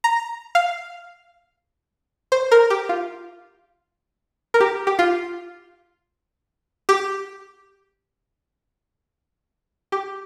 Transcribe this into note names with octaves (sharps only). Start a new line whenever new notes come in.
A#5
F5
C5
A#4
G4
F4
A#4
G4
G4
F4
G4
G4